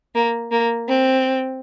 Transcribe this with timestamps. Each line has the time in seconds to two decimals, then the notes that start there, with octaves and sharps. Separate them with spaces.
0.15 A#3
0.51 A#3
0.88 C4